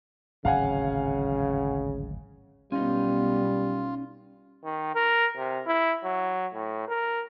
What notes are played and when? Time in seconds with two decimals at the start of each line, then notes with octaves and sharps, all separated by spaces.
0.45 D1 G#1 C#3 F#3 F5 F#5 G#5
2.72 B1 B2 G3 B3 C#4 D#4 F4
4.64 D#3
4.95 A#4
5.37 C3
5.66 E4
6.04 F#3
6.54 A2
6.88 A#4